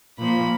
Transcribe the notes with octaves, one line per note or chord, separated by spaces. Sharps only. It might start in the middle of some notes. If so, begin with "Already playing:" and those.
A#2 F3 A#3 B5